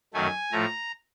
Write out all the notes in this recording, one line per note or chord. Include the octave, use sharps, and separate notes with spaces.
F#2 D#3 F#3 A3 G#5
A2 F3 A3 A#5